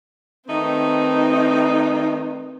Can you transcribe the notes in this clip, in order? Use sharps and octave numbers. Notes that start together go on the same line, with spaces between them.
D#3 A3 C4 D#4 B4